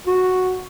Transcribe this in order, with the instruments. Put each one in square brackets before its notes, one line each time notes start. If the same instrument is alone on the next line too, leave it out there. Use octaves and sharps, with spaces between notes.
[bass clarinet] F#4